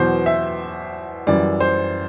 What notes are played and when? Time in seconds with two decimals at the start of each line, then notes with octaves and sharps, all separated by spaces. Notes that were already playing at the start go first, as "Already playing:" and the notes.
Already playing: E2 B2 F#3 C5
0.26 E5
1.27 F#2 E3 G3 D5
1.60 C5